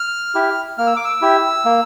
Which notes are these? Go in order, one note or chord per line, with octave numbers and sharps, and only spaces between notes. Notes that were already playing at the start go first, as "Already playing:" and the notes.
Already playing: F6
E4 G4
A#3 F6
E6
D6
E6
E4 G4
A#3